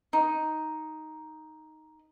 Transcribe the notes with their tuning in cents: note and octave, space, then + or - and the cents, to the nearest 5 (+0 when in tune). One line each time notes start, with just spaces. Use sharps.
D#4 +5